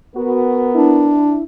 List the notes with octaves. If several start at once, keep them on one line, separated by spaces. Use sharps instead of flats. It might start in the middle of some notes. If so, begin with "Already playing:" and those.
B3 F#4 A#4
D4 E4